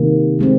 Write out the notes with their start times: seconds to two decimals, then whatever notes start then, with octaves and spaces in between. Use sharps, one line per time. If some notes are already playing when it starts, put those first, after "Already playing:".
Already playing: C3 D#3 A#3
0.39 F3 G#3 C4